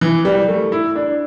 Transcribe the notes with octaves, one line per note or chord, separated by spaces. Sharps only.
E3
G3
A3
E4
D4